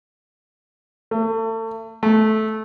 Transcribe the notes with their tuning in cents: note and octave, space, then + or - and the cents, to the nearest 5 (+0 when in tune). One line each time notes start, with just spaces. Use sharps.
A3 +35
A3 -15